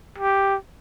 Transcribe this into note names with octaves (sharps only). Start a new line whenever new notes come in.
G4